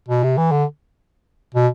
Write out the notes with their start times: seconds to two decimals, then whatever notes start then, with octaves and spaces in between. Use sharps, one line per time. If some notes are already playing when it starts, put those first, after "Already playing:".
0.08 B2
0.23 C3
0.38 E3
0.52 D3
1.55 B2